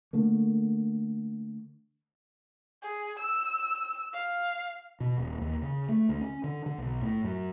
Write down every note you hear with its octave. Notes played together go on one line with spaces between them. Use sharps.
D3 A3 A#3
G#4
E6
F5
B2
D#1
D#2
C#3
A3
D2
C#4
D3
D3
B1
A2
F#2